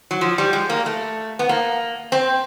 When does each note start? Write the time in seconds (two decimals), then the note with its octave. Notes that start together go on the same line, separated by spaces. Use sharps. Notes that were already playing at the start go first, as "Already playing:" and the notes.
0.11 F#3
0.21 F3
0.38 G3
0.53 G#3
0.70 A#3
0.86 A3
1.39 B3
1.49 A#3
2.12 C4